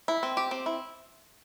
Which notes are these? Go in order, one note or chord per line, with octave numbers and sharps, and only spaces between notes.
E4
C4
G4
C4
E4